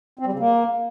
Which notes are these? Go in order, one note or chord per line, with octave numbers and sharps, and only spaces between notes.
C4
G3
C#3
A#3